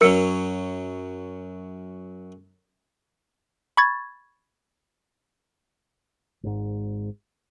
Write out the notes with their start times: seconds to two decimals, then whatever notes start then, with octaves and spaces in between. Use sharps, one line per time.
0.01 F#2 F#3 C#4 A#4 E6 C#7
3.77 B5 C#6 G#6 A6
6.43 G#1 G#2